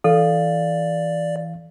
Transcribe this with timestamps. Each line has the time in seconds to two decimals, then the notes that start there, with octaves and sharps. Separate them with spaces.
0.04 E3 A4 D5 F5